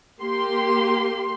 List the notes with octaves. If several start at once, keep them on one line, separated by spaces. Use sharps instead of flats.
A#3 G4 C6